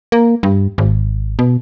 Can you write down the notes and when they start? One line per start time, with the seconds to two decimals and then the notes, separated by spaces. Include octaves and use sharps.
0.12 A#3
0.43 G2
0.78 G#1
1.39 B2